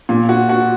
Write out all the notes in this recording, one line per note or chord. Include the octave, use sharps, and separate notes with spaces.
A#2
F#4
F#4